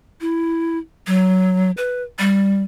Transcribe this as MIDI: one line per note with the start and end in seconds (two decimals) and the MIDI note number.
0.21 0.78 64
1.07 1.71 54
1.77 2.03 71
2.19 2.62 55